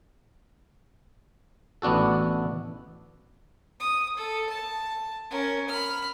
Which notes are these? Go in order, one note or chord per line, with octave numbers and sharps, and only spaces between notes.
A1 B3 D4 F#4 A4
D#6
A4
A5
C#4 A#4
B5 F6